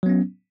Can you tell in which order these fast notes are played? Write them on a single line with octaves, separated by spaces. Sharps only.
F#3 B3 C#4